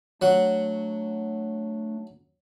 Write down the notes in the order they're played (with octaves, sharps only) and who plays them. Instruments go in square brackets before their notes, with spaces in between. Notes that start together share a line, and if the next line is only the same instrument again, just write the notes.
[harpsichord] F#3 F#5 [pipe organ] A3 D4